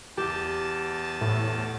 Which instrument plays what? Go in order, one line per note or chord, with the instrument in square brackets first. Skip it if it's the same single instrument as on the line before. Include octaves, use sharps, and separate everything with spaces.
[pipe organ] E2 A5 [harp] G4
[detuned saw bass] A2